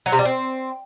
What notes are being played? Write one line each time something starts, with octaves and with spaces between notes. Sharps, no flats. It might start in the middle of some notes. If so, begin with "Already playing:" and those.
F#3
C3
G3
C4